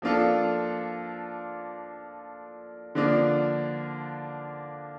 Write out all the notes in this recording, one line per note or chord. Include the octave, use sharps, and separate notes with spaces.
F3 A#3 D4 F4 A4
D3 F3 A#3 D4 F4